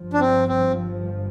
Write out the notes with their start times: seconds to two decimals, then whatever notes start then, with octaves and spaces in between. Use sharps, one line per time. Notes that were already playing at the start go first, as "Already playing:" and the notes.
Already playing: G1 G2 F3
0.13 D4
0.20 C4
0.48 C4